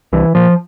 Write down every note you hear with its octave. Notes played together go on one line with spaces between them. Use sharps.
C2 E3
A#2 F3